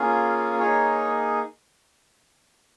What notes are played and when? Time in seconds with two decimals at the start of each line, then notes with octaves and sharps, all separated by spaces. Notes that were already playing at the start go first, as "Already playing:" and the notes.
Already playing: A#3 C#4 F4 G#4
0.60 A#3 D#4 G#4 C#5